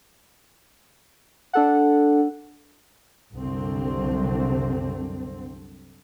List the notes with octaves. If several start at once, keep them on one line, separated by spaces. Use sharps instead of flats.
D4 A4 F#5
C2 F#2 D3 C4